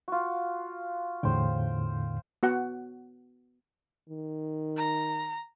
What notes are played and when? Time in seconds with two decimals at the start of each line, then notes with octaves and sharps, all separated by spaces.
0.08 F4 F#4
1.23 E2 A2 D3 C5 G5
2.43 B3 F#4 F#5
4.10 D#3
4.77 A#5